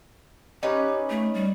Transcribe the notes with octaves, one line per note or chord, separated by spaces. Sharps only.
C#4 D#4 G4 B4
A3
G3